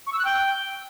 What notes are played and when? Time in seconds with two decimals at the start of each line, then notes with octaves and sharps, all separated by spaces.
0.07 C#6
0.13 E6
0.19 F#6
0.25 G5